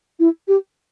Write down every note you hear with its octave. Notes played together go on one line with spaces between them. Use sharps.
E4
G4